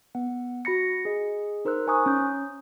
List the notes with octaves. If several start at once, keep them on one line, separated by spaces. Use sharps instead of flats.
B3 F#5
F#4 B5 A#6 C#7
G#4 D#5
D#4 A#4 C5 E6 F#6
C5 G#5 A#5 C#6 D#6 F#6
C#4 G6